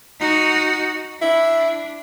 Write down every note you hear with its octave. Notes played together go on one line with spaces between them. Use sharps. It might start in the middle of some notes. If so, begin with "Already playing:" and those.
D#4 F#4
D4 E4